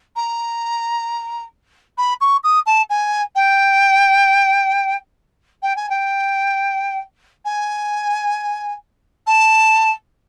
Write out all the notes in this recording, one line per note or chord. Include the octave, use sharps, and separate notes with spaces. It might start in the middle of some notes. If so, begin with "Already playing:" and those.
A#5
B5
C#6
D#6
A5
G#5
G5
G5
G#5
G5
G#5
A5